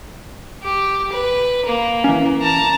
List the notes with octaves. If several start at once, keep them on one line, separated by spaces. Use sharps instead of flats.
G4
B4
A#3
E3 C#4
A5 A#5